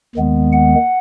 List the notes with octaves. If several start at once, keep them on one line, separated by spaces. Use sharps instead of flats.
D#2 D#3 G#3 B3
F#5